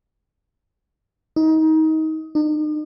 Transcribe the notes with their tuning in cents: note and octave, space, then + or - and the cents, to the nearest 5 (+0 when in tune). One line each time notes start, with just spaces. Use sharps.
D#4 +25
D#4 -40